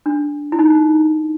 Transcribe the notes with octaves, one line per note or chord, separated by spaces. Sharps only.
D4
E4
D#4